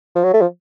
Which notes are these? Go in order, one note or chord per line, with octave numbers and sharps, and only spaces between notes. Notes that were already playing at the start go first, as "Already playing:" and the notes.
F3
F#3
A3
F3